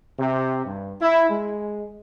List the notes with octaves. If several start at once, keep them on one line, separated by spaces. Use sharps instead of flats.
C3
G2
E4
G#3